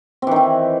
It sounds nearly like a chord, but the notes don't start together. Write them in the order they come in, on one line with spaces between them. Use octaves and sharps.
C4 E3 D#3 E4